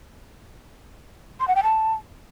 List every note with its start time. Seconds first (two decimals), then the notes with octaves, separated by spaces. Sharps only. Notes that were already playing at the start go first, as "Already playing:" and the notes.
1.40 C6
1.48 F#5
1.56 G5
1.63 A5